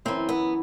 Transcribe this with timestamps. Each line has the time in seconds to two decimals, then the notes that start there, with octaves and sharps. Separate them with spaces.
0.05 F#2 E3 C4
0.29 B3